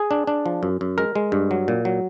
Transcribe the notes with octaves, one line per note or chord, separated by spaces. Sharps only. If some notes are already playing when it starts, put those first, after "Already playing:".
Already playing: G#4
D4
D4
F3
F#2
F#2
G#3 A#4
G#3
G2
F#3
A#2
F#3